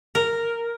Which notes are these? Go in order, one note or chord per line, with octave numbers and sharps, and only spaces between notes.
A#4